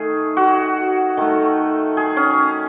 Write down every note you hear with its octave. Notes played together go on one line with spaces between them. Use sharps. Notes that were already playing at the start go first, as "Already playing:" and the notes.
Already playing: D#3 A3 G#4
F#4
D#3 A3
G#4
C#4